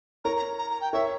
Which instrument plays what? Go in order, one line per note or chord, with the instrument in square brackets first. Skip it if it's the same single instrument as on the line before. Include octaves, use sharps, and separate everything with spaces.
[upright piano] A#4 C#5 [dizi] A#5
[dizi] A#5
A#5
A#5
G5
[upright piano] A#4 C#5 [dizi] E5